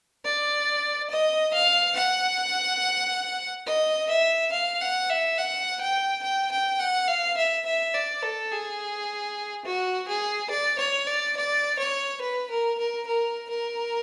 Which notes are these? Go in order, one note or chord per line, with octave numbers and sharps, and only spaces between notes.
D5
D#5
F5
F#5
D#5
E5
F5
F#5
E5
F#5
G5
G5
G5
F#5
F5
E5
E5
D5
A4
G#4
F#4
G#4
D5
C#5
D5
D5
C#5
B4
A#4
A#4
A#4
A#4